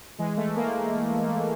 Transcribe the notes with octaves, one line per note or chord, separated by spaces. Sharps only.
E3 G#3
A3
E3
A#3